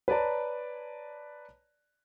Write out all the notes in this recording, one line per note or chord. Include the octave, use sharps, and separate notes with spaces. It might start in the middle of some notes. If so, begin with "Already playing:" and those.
B4 C#5 D5 A5 A#5